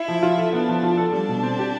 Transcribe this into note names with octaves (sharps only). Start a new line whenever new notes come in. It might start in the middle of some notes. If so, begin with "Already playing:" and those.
Already playing: E4
F3
F4
A4
B3 D4
F3
F4
A4
G3 D4
B2
C4
G4